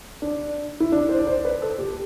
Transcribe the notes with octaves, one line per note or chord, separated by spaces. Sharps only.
D4
E4
D4
C5
D5
C5
B4
A4
G4